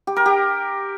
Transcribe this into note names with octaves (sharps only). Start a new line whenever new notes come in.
G4
A#4
G4